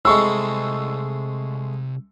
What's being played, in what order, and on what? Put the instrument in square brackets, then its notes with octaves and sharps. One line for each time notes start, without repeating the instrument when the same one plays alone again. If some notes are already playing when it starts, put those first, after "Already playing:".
[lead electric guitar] C2 B5 [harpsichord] G#3 A3 C4 [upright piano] C#6 E6